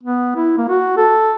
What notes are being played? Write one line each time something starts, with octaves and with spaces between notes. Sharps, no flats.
B3
E4
A#3
F#4
A4